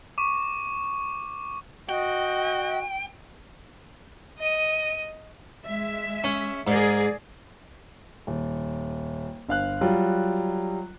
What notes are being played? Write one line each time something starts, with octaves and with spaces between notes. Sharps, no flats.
C#6 D6
F#4 D#5 G5
D#5 D#7
G#3 E5
C#4
G#2 G#4 A#4 D5
D#1
G1 F5 F#6
F#3 G3 F4